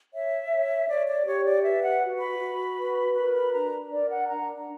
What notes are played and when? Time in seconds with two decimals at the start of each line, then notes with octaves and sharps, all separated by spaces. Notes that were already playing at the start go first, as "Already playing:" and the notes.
0.12 C#5 E5
0.50 C#5
0.88 C#5 D5
1.07 D5
1.25 G4 C#5
1.45 D5
1.63 B4 E5
1.82 F#5
2.02 F#4
2.20 B5
2.39 F#4
2.77 B4
3.15 A#4 B5
3.34 B5
3.53 D4 A#5
3.91 A#4 D5
4.10 F#5
4.28 D4 A#5